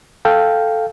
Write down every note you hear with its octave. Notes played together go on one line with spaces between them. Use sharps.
A4 F5 G5